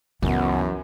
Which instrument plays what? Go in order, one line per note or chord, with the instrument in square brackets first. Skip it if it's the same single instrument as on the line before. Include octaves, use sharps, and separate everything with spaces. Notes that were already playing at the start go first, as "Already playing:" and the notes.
[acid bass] C#2 [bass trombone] F#2 [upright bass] E3 [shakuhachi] B3